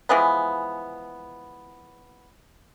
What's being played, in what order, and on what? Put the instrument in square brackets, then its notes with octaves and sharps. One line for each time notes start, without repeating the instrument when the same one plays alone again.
[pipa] E3 F3 G#3 B3